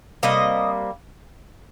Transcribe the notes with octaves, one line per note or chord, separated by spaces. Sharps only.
C3 G3 A#3 D#5